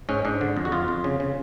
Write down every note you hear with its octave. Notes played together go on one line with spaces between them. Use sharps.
G#2 C#4
G#2 D4
D3
F2
F#4
F2 F4
F2
C#3
C#3